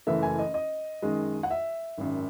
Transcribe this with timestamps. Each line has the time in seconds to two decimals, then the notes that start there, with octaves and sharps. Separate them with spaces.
0.07 F#1 F#2 E3 A3 E5
0.23 G#5
0.39 D#5
0.54 D#5
1.02 F#2 D#3 G#3
1.43 F#5
1.50 E5
1.98 G#1 F#2 D#3